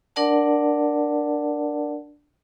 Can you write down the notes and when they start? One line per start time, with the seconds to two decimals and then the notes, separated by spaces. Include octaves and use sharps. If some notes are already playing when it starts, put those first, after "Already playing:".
0.16 D4 A#4 D5 F#5 A5